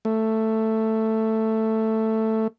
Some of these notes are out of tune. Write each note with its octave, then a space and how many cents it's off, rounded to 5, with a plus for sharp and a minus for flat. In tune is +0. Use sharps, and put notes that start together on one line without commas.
A3 +5